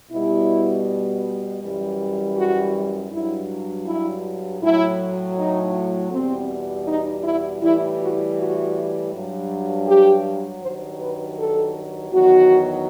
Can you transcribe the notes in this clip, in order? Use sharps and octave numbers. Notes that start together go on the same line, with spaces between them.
B2 G3 E4
F#2 E3 G3
F#4
G2 F#3 E4
E4
A2 F#3 E4
D#4
E2 B2 G3 C4
D#4
E4
A2 E3 G3 E4
F#4
F#4
G2 F#3
G4
G2 D#3 F#3 C5
B4
A4
E2 D#3 F#3 F#4